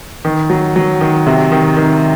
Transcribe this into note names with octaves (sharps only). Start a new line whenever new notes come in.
D#3
F#3
F#3
D#3
C3
D#3
D#3